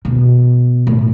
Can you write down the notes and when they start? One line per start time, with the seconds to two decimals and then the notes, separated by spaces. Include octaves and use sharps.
0.05 B2
0.87 A2